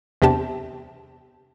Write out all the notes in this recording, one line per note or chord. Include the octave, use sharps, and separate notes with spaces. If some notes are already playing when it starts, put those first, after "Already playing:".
E2 C3 D4 G4 A5